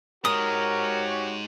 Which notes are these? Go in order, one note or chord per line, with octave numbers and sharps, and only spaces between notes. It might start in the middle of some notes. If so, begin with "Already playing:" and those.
G#2 G#3 F#4 G4 A#4 C#5 D#6